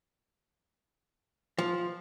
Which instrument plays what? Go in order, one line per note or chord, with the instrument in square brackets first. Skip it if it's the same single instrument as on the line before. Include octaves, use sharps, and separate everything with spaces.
[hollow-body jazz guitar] F3